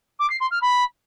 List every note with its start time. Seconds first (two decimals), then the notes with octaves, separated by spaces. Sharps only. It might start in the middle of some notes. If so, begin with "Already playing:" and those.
0.19 D6
0.30 C7
0.40 C6
0.51 F6
0.61 B5